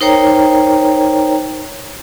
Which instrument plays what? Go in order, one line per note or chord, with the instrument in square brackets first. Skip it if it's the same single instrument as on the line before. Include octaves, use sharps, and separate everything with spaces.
[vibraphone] D#4 A#4 C5 C#5 G5 A#5